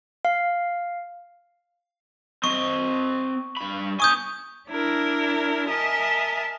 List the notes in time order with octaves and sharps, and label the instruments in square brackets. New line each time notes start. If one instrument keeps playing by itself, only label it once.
[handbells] F5
[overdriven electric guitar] C4 D#5 [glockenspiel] C#6
[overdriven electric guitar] G2 B5
[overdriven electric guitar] D4 G#5 [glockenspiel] C#6 D#6 G6
[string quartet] D4 E4 A#4
A#4 D#5 E5 G#5 A5